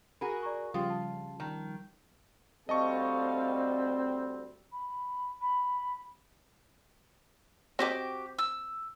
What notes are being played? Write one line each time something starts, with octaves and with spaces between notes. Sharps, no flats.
F#4 G#4 A#4 B5
D5 A#5 C#6
C#3 F3 G3 F4 G5 C6 D#6
A5
D#3
D2 G3 C4 A4 D#5 F5 A5 C#6
B5
B5
C4 F#4 G4 D#5 D6
E6